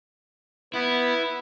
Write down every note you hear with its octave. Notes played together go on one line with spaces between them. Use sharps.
B3 E4